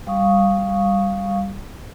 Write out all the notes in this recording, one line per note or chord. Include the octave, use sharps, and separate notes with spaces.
G3 F5 C#6 D#6